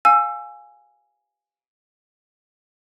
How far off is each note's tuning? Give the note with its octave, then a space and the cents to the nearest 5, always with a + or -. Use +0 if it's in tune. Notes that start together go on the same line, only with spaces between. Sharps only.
F5 +20 G#5 +0 E6 +20